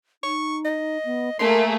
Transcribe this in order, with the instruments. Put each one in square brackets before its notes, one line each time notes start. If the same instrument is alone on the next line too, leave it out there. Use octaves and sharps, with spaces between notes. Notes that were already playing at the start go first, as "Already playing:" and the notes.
[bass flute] D#4 [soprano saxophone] C#6
[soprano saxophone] D#5
[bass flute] B3
[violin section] A3 A#3 G#4 [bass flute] A#4 [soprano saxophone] C6